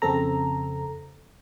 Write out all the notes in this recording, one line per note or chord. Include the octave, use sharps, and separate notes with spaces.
F2 C#3 C4 A4 A#5